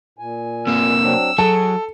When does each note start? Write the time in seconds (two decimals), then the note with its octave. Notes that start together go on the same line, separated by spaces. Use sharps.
0.19 A#2 G#5
0.67 C3 A#3 E6
1.02 F#3 C4 D4
1.38 F#3 G#4 A4